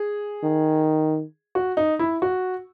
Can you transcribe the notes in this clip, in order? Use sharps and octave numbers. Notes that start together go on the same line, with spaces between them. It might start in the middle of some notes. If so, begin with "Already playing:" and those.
Already playing: G#4
D#3
F#4
D#4
E4
F#4